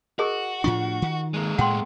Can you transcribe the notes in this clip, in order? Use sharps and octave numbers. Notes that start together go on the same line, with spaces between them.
F#4 G#4 A#4 D#5
A2 F3 D4 F4 C#6
D#3
G#3 A#3
A2 F#5 G5 C6